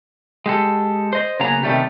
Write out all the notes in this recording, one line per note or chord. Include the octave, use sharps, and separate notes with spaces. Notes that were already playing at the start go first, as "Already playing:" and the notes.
G#3 G4 A4
C5 D#5
C#3 F#3 A#3 B3 G#4 A#5
C3 D#3 E3 G3 A3 G4